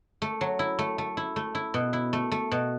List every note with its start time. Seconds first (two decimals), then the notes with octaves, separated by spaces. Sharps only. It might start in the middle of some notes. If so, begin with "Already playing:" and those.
0.22 A3
0.41 F#3
0.59 E4
0.79 A3
0.98 A3
1.17 E4
1.36 A3
1.55 E4
1.74 B2
1.93 E4
2.13 A3
2.31 A3
2.51 B2